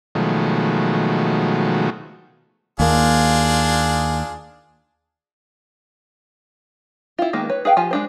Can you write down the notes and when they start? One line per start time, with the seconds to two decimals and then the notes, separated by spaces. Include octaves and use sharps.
0.15 B2 D#3 F3 F#3 G#3 A3
2.80 D#2 A#3 D4 F4 G#4
7.19 E4 F4
7.33 D#3 G#3 A#3 B3
7.50 B4 C#5
7.65 G#4 B4 F5 G5
7.77 F3 F4 G4 G#5
7.91 G#3 D4 C5